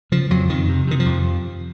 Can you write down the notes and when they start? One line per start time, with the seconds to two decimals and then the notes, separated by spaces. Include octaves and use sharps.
0.12 C#3 F3
0.30 F2 F#3
0.49 F2 D#3
0.69 C3
0.87 C3 D#3
1.00 F3
1.06 F2